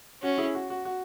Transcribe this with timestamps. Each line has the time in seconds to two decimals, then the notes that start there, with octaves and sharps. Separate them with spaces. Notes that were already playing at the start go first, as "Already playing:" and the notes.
0.22 C#4 F#4
0.38 E4 G#4
0.55 F#4
0.70 F#4
0.85 F#4